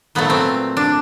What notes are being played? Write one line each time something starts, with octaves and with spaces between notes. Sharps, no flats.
A#2 F#3 A3 B3
C4
D4